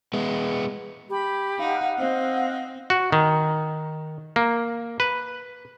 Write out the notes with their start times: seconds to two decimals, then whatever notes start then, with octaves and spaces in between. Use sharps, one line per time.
0.13 G#3 B3
1.10 G4 B5
1.59 D#4 F5 F#5
1.98 C4 C5 D#5
2.90 F#4
3.12 D#3
4.36 A#3
5.00 B4